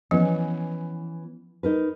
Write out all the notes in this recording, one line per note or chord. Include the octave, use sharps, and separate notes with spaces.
E3 F3 B3 C#4
D#4 A#4 B4